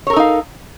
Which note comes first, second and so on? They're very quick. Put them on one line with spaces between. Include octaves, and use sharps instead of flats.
C#5 A#4 A4 D#4 F5